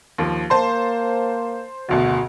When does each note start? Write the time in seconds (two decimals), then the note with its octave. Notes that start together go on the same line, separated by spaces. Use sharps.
0.18 D#2 F3
0.50 A#3 C5 A5 C6
1.89 F#1 D2 B2 F#4